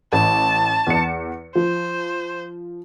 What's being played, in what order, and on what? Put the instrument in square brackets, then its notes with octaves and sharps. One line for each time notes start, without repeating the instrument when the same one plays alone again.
[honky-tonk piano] A1 [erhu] A5
[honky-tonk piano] E2 C#7
[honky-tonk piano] F3 [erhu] C5